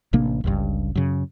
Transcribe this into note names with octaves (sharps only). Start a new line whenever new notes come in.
A1 C3 A#3 D4
G1 C#2 G2
F#2 C#3